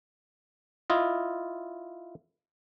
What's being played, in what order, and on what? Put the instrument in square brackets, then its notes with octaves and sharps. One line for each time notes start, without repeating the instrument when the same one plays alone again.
[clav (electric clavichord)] E4 F4 D#5